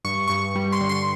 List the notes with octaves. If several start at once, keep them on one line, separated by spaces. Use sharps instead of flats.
G2 C#6
G2 C#6
G3
C6
D3
C6